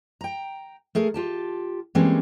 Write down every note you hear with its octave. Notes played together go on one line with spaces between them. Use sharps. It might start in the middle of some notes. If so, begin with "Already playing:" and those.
G5 A#5
A3 G#4 A#4
F4 G4 A5
E3 G3 G#3 A#3 C4 C#4